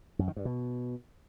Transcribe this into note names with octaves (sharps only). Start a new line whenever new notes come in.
F#2
D#3
G2
B2